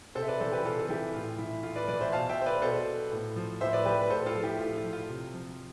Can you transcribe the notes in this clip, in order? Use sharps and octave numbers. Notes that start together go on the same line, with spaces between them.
C3 A4 C5
E5
B4 D5
E3 A4 C5
G4 B4
C3 F4 A4
A4
E3 E4 G4
A2 F4
E3 E4
A2 F4
B4 D5
E3 B4 D5
C5 E5
B2 F5 A5
E5 G5
C5
B4 D5
B2 A4 C5
A2
F3
A2 C5 E5
B4 D5
F3 G4 B4
B4
A2 A4 C5
F4 A4
F3
E4 G4
A2 F4
F4
F3
F4
C3
F3